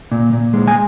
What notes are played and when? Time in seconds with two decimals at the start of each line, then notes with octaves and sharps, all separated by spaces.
0.12 A#2
0.33 A#2
0.53 G#3
0.68 G#5